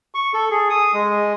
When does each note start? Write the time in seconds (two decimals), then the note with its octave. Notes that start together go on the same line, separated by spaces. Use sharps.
0.15 C#6
0.34 A4
0.50 G#4
0.70 D#6
0.94 G#3